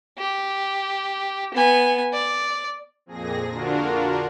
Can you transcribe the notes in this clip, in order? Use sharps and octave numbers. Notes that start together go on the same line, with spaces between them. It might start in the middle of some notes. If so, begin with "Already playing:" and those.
G4
B3 G#5
D5
F2 A#2 G#4 A#6
D3 D4 F4 F#4 A#4